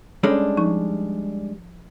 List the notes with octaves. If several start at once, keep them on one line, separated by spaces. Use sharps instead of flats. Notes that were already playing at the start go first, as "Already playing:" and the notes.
G3 G#3 C#4 D4 A4 C#5
F3 D#4 C#6